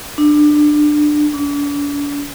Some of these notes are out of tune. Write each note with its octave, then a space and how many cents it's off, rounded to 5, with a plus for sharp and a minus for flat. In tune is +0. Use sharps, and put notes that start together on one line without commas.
D4 +20
D4 -40